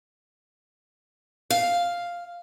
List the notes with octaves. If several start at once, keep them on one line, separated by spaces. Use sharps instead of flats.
F5